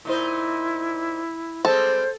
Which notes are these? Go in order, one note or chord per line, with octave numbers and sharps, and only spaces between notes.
A#2 D#4 E4 C5
G3 G#3 C4 A4 C5